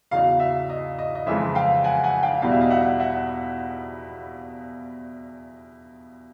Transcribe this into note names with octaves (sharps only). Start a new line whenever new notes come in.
E2 C#3 F#3 D#5 F5
E5
D#5
D#5
D#5
F2 C#3 E3 G#3 E5
F5 G5
F#5 G#5
F#5 G#5
F5 G5
E2 B2 G3 F5
E5
D#5 F5
E5 F#5
E5 F#5